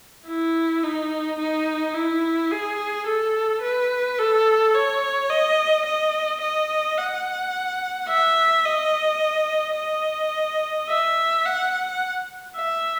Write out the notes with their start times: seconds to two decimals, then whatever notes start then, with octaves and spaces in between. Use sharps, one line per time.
0.27 E4
0.83 D#4
1.38 D#4
1.94 E4
2.51 G#4
3.06 A4
3.62 B4
4.18 A4
4.74 C#5
5.29 D#5
5.85 D#5
6.41 D#5
6.97 F#5
8.09 E5
8.65 D#5
9.76 D#5
10.89 E5
11.45 F#5
12.56 E5